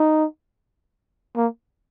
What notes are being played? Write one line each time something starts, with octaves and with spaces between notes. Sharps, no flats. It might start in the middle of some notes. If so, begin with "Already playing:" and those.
Already playing: D#4
A#3